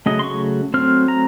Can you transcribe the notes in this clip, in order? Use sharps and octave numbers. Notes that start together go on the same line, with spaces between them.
C#3 F#3 A3 D#5
C6
C#6
F#3 A3 C4 F6
A#5